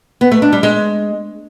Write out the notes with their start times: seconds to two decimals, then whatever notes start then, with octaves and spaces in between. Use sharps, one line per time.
0.21 B3
0.31 A3
0.42 D4
0.52 G3
0.63 G#3